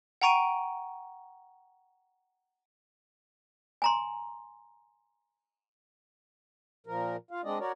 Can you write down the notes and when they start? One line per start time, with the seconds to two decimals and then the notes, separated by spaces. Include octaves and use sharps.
0.21 F#5 G5 A#5 C#6 D7 D#7
3.82 G#5 A#5 C6
6.87 A#2 F3 A#4
7.31 F4 F5
7.44 G#3 C4 D4 D5 D#5
7.59 F#4 A#4 C#5 D5